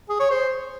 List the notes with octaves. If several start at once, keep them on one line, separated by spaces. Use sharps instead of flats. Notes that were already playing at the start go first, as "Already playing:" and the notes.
G#4
C#5
C5